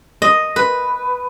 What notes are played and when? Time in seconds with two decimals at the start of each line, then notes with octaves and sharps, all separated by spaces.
0.22 D#5
0.56 B4